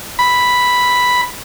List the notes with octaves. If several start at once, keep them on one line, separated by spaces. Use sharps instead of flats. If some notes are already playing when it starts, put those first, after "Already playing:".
B5